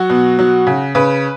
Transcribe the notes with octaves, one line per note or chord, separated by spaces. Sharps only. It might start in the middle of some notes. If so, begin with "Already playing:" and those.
Already playing: F#3 F#4
B2
F#3
C#3
C#3 B4